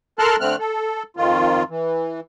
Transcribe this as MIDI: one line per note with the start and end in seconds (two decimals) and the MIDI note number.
0.19 0.36 69
0.19 0.36 70
0.19 0.36 81
0.19 0.36 84
0.19 0.36 89
0.19 0.36 90
0.40 0.56 50
0.40 0.56 57
0.40 0.56 60
0.40 0.56 89
0.40 0.56 90
0.59 1.03 69
1.17 1.63 41
1.17 1.63 51
1.17 1.63 65
1.69 2.20 52